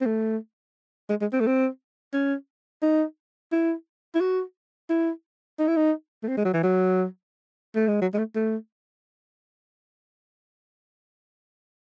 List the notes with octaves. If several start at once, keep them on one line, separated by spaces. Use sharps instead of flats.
C4
A3
G#3
G#3
C4
A3
C4
C#4
D#4
E4
E4
F#4
E4
D#4
E4
D#4
A3
C4
G#3
F#3
E3
F#3
A3
G#3
F#3
G#3
A3
A3